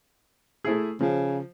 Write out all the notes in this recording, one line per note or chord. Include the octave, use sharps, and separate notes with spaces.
A3 E4 G#4
C#3 F3